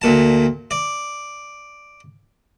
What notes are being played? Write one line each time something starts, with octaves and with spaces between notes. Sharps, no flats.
D2 A#2 A5
D5